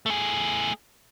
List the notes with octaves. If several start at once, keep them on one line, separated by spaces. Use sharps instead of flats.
A3 G#4